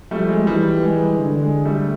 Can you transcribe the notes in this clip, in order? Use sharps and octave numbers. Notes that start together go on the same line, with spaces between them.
F3 G3 A3
G#3
G#3
E3 G3
G#3
D3
G#3
G3 A3